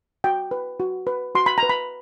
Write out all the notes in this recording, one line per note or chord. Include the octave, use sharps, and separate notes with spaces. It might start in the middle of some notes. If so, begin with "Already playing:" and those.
F#4 G5
B4
F#4
B4
F#4 C6
B5
A#5
B4
B5